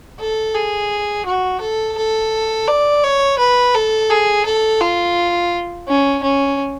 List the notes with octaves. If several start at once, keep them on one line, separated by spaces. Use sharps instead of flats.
A4
G#4
F#4
A4
A4
D5
C#5
B4
A4
G#4
A4
F4
C#4
C#4